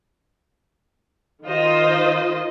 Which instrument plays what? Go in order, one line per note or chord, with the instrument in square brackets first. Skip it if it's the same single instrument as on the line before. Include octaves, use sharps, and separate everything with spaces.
[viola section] D#3 F4 C5 D#5